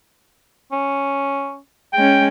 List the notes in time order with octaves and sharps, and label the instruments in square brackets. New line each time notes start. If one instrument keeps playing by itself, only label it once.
[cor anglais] C#4
[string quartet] G#3 C#4 [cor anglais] G5